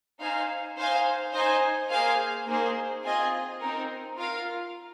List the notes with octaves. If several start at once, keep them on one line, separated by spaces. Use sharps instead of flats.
D#4 C5 F5 G#5
D#4 C5 F5 G#5
D#4 C5 D#5 G#5
A#3 G#4 C5 F5 G#5
A#3 D#4 G#4 C5
C4 F4 G#4 D#5 G#5
C4 D#4 A#4
F4 A#4 F5